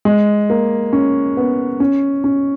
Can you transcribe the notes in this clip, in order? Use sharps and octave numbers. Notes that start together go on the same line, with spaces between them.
G#3
A#3
C#4
B3
C#4
C#4